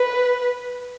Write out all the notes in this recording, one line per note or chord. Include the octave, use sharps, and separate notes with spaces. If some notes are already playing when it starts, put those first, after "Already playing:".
Already playing: B4